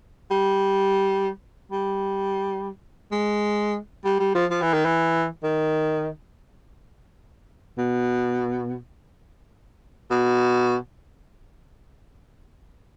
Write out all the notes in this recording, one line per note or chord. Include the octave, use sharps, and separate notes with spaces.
G3
G3
G#3
G3
G3
F3
F3
E3
D#3
E3
D#3
B2
B2